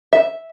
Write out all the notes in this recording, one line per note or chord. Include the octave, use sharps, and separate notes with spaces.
E5